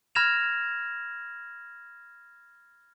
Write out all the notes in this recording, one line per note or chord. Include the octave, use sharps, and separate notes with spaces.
B5 F6 G#6 A#6 E7 F7